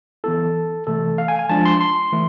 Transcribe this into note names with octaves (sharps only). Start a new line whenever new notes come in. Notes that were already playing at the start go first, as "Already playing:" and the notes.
E3 B3 E4 A4
C3 E3 A3 A4
F5
G#5
G#5
F3 G#3 D4 F4 A5
C6
C6
E3 A3